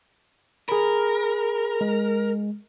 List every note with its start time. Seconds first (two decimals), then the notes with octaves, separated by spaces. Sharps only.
0.69 G#4 A#4 B5
1.81 G#3